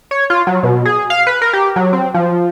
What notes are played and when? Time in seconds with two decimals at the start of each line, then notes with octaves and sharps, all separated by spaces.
0.11 C#5
0.30 F4
0.47 F#3
0.63 B2
0.86 G#4
1.10 F5
1.27 B4
1.42 A#4
1.53 G4
1.76 F#3
1.93 C4
2.14 F3